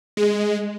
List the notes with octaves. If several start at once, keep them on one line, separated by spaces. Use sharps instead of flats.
G#3